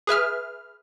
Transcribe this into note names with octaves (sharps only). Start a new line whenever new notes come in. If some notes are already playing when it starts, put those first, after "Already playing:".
G#4 B4 E5 F6